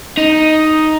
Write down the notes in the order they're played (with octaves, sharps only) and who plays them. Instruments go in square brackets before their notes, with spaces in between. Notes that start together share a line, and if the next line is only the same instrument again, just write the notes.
[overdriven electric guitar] D#4